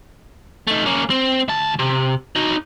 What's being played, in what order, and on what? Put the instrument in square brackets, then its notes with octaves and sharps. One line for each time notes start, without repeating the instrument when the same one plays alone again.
[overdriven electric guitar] A3 D#4
A#3 C#4
C4
D2 A5
C3
D#4 F#4